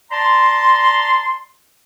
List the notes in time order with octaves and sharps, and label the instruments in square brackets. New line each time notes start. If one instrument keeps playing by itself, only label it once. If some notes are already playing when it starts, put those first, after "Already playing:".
[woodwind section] D5 A5 A#5 C6